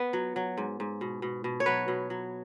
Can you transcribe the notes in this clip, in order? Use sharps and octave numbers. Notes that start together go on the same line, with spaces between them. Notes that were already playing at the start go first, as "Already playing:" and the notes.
Already playing: B3 B4
F#3
F#3
G#2
G#2
B2
B2
B2
C#5
F#3 B4
B2
F#3